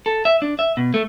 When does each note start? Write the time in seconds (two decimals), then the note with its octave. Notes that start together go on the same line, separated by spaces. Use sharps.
0.06 A4
0.25 E5
0.42 D4
0.59 E5
0.77 B2
0.94 A3